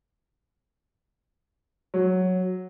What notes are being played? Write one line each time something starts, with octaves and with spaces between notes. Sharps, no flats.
F#3